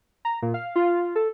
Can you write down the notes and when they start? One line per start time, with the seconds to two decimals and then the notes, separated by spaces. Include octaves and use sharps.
0.25 A#5
0.42 A#2
0.54 F5
0.76 F4
1.15 A4